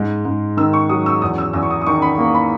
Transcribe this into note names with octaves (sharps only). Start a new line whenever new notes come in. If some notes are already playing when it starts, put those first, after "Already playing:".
Already playing: G#2 G#3
G#2
D#3 E6
C#6
F#3 D#6
E6
E2 D#6
E6
E2 E6
C#6
D#6
D#6
D#3 C#6
B5
A#3
B5